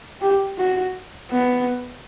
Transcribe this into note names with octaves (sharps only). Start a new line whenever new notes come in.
G4
F#4
B3